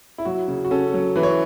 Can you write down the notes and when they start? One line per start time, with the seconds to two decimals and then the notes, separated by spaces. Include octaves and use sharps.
0.18 E4
0.25 F#3 F#4
0.48 C#3
0.65 F#4
0.71 C#4 A4
0.94 F#3
1.16 E3 B4
1.23 C#5